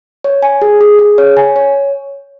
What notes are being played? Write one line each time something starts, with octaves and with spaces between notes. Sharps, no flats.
C#5
G#5
G#4
G#4
G#4
C#5
G#5
C#5